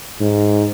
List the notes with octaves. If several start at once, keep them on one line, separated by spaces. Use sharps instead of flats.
G#2